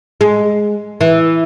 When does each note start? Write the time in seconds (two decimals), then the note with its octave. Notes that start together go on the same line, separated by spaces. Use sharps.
0.21 G#3
1.01 E3